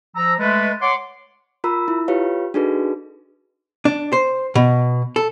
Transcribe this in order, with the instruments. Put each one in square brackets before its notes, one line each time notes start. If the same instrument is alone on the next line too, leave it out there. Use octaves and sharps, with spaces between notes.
[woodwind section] F3 A#5 E6
G#3 A3 B4
C#5 F#5 C6 D6
[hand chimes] F4 A#4 A#5 B5 E6
E4
F4 G4 B4 C#5 F5
D4 D#4 F#4 G#4 A4 B4
[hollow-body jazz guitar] D4
C5
B2
A4